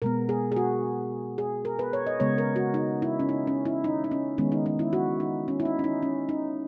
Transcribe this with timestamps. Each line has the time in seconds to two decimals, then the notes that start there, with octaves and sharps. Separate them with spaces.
0.02 B2 G#3 B3 A#4
0.29 G#4
0.52 G#4
0.56 F#4
1.38 G#4
1.65 A#4
1.79 B4
1.93 C#5
2.07 D#5
2.20 C#3 G#3 B3 C#5
2.38 A#4
2.56 F#4
2.74 D#4
3.02 E4
3.20 C#4
3.29 D#4
3.47 C#4
3.65 E4
3.84 D#4
4.04 D#4
4.11 C#4
4.38 D#3 G#3 B3 C#4
4.52 D#4
4.66 D#4
4.79 E4
4.93 F#4
5.20 D#4
5.48 C#4
5.60 E4
5.65 D#4
5.79 C#4
5.84 D#4
6.03 C#4
6.29 D#4